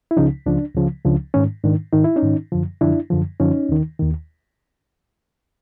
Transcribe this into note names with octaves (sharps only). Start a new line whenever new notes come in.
E4
C#2 C#3 F3 C#4 D#4
C#2 C#3 F3 D4
C#2 C#3 F3
C#2 C#3 F3 D4
G#2 D#3 C#4
G#2 D#3 D4
G#2 D#3 D#4
E4
C#4 D#4
G#2 D#3
F#2 D3 F3
F#2 D3 F3 D4 E4
F#2 D3 F3
F#2 D3 F3 C#4 D#4
D#2 D#3
D#2 D#3